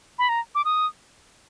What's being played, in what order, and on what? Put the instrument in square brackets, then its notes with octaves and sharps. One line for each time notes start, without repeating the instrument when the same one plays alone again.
[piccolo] B5
A#5
D6
D#6